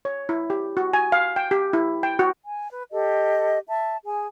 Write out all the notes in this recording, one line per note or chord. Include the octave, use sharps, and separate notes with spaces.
C#5
E4
G4
F#4
G#5
F5
G5
G4
E4
G5
F#4
G#5
B4
G4 A4 D#5
E5 A5
G#4 G#5